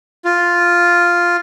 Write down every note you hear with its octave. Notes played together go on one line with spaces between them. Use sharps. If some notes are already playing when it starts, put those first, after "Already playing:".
F4